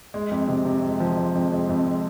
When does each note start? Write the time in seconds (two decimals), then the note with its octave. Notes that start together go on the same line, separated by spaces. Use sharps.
0.14 G#3
0.31 F2
0.48 C3
0.65 C3
0.83 G#3
1.00 F3
1.17 G#3
1.35 F2
1.51 G#3
1.69 F2
1.87 G#3